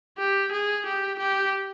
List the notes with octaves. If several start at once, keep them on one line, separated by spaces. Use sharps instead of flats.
G4
G#4
G4
G4